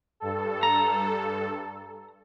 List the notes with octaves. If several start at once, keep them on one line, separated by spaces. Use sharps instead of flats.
G2 A4
A#5